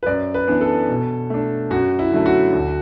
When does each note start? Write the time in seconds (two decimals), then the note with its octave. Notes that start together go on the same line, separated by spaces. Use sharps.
0.03 B4
0.06 F#2 D5
0.34 B4
0.48 E3 B3 D4
0.61 A4
0.88 B2
1.30 A3 D4
1.70 F#2 F#4
1.99 E4
2.11 D3 F#3 A3
2.26 F#4
2.53 D2